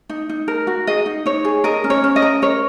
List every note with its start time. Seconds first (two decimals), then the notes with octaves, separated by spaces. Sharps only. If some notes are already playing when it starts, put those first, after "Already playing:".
0.09 D#4
0.29 D#4
0.48 A#4
0.67 F#4
0.87 G#4 D#5
1.06 D#4
1.26 D#4 C#5
1.45 G#4
1.64 A#4 D#5
1.84 C#4
1.90 C#5
2.04 C#4
2.16 D#5
2.22 A#4
2.42 A#4 C#5